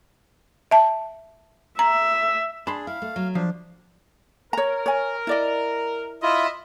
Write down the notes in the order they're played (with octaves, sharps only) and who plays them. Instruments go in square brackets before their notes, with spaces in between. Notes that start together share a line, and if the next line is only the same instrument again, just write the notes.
[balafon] E5 A5
[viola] E5 [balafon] A#5
[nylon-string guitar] D4 [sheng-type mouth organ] G#4 [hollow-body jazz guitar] A5 B5 C6
[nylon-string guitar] E4 [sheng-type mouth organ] F5
[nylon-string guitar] A3
F#3
[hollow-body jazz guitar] F3 F5 [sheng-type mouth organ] D4
[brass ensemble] A#4 [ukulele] C#5 A#5
[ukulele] C#5 G#5
E4 D5 D#5
[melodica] E4 F4 [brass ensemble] D#5 E5